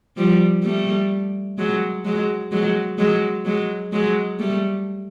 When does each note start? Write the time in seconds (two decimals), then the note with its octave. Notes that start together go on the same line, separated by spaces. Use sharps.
0.17 F3 G3
0.64 G3 A3
1.58 F#3 G#3
2.05 F#3 G#3
2.52 F#3 G#3
2.98 F#3 G#3
3.45 F#3 G#3
3.92 F#3 G#3
4.39 G3 A3